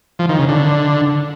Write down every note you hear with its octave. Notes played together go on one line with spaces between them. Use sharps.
F3
D#3
C#3
D3